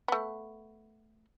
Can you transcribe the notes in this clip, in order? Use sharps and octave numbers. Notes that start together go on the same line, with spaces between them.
A3 B3